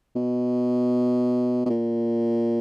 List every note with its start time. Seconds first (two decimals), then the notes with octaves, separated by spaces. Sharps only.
0.15 B2
1.66 B2
1.69 A#2